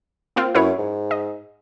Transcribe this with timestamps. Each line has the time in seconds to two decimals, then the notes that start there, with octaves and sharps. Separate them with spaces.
0.36 A#3 C4 F4
0.55 F#2 E4 B4 C#5
0.78 G#2
1.11 D#5